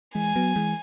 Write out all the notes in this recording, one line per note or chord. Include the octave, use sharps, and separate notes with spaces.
E3 G#3 G#5
F#3 B3
E3 G#3